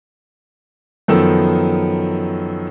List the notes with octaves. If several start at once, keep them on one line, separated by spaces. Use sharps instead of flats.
F#2 D#3 F3 B3 A4 E6